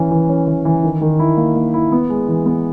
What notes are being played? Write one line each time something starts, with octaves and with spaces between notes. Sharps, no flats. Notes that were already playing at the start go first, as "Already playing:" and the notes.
Already playing: E3 C#4
E3
C#4
E3
E3
D#3
D#3
E4
A#3
A#3
E4
B3
G#3
E3
B3